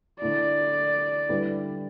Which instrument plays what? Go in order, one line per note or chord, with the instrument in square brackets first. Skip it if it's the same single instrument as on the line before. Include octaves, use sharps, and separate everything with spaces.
[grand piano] D3 A3 E4 [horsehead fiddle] D5
[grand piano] D3 G3 E4 G4 B4